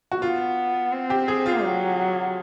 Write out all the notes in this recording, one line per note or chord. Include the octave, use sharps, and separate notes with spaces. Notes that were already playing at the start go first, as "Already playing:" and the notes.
F#4
B3 F4
C4
G4
G#4
F4
F#3